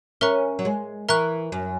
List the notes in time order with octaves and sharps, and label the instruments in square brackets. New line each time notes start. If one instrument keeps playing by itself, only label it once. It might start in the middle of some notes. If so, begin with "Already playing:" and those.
[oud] C#4 [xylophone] A#4 E5 A#5 C#6 F#6
[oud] F#3
G#3
[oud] E3 [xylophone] A#4 E5 A#5 C#6 F#6
[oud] F#2